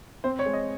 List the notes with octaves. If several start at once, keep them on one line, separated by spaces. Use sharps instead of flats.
C4 C5
C#5
G#3
D#5